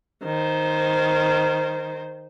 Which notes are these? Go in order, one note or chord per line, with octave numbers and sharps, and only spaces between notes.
D#3 C5